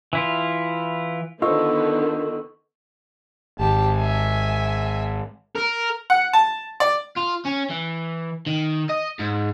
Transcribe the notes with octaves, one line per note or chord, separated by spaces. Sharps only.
E3 E4 F4
D3 D#3 B3 F4 C5 D#5 C#6 E6
G#1 G4 A5
E5 G#5
A#4
F#5
A5
D5
F4
C#4
E3
D#3
D#5
G#2